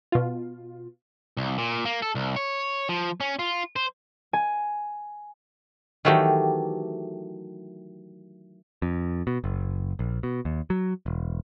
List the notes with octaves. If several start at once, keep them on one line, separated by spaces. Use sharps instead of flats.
B2 F4
C2
A#2
A#3
A4
C2
C#5
F3
C#4
F4
C5
G#5
D#3 E3 F#3 A3 F#4 G4
F2
B2
F#1
A#1
B2
D#2
F#3
E1